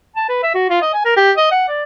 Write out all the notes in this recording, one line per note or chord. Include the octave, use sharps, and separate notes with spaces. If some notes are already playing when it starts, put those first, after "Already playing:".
A5
B4
E5
F#4
F4
D#5
G#5
A#4
G4
D#5
F#5
D5